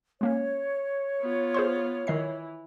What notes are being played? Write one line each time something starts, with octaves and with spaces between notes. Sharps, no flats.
G#3 A#3 C#4 C#5
B3 F4
G#4 C5 C6
D#3 E3 D#5 C7